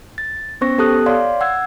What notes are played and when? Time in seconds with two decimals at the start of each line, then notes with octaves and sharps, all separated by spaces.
0.18 A6
0.61 B3 C#4 C5 C#6 A#6
0.78 B3 G4 A4 A5 D#6 F#6
1.06 C#5 D5 F5 C6
1.41 F#5 E6 G#6